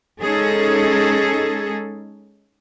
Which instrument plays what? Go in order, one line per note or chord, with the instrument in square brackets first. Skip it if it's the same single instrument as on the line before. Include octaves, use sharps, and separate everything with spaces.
[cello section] G#3 C#4 D#4 G#4 A4